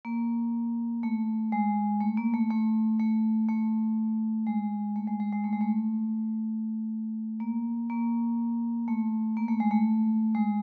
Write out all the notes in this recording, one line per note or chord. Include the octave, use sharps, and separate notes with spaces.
A#3
A3
G#3
A3
A#3
A3
A3
A3
A3
G#3
A3
G#3
G#3
G#3
A3
G#3
A3
A#3
A#3
A3
A#3
A3
G#3
A3
G#3